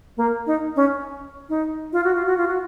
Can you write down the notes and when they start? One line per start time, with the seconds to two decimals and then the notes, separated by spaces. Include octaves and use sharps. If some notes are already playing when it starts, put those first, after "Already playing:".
0.17 A#3
0.47 D#4
0.76 C#4
1.49 D#4
1.93 F4
2.04 F#4
2.15 F4
2.26 F#4
2.37 F4
2.47 F#4